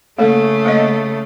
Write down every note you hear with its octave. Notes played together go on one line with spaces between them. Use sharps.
C#3 A3 A#3 A4
A#3 D#5